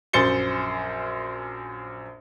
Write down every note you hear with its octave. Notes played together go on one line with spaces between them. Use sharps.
A#1 F#2 C5 A6 C#7 G7